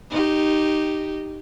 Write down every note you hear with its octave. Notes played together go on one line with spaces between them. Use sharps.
D#4 G4